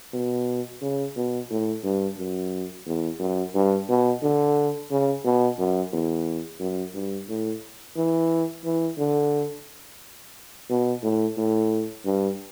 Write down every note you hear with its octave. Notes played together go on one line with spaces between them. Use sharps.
B2
C#3
B2
A2
G2
F#2
E2
F#2
G2
B2
D3
C#3
B2
F#2
E2
F#2
G2
A2
E3
E3
D3
B2
A2
A2
G2